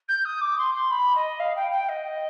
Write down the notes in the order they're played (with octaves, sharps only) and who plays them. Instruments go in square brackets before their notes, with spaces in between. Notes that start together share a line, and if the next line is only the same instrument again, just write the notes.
[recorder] G6
D#6
D6
C6
C6
B5
D#5
F5
G5
G5
D#5